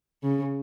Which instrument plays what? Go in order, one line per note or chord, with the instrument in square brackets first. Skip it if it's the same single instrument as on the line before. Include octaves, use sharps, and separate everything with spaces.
[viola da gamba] C#3